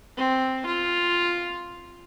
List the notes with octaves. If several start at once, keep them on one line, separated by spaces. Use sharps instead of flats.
C4
F4